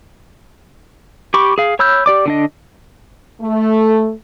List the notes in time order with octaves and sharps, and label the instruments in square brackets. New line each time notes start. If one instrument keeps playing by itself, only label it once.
[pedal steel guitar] G4 B5 C#6 D6
G#4 F5
C#5 B5 E6 F6 G6
G4 D5 D6
D3 D4 D#5
[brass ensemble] A3